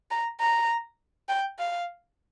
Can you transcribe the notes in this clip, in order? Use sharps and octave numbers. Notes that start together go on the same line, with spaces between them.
A#5
A#5
G5
F5